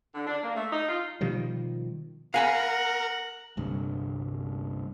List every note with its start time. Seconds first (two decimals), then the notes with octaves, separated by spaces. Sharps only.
0.14 D3
0.27 D4
0.43 A#3
0.56 A3
0.72 D#4
0.89 F4
1.21 B2 D#3 F3 G3
2.34 A#4 F5 F#5 G#5 B5
3.57 G1 C2 G2